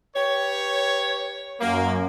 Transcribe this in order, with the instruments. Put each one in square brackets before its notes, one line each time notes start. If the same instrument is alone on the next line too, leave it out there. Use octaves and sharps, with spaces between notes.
[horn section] G4 B4 C#5
[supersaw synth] F#2 [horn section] A#3